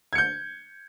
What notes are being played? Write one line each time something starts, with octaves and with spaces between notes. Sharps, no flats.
G6 G#6 C#7